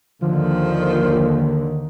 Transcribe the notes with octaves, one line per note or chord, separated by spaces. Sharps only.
D#2 D3 D#3 F3